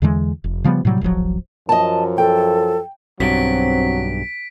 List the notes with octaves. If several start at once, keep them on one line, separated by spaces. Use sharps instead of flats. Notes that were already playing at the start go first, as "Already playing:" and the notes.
E2 D3 E3 G#3
F1
C#3 F3 G3 B3
A2 C3 F#3 G3
D1 G#1 F3 F#3
F#2 F3 D#5 A5
A4 G5
B1 G2 F#3 C4 B6 D7